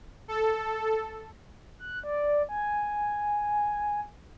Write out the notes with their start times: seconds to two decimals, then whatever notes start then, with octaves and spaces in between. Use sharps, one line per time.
0.28 A4
1.79 F#6
2.04 D5
2.49 G#5